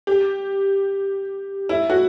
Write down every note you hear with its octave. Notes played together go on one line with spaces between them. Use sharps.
G4
E4
F#4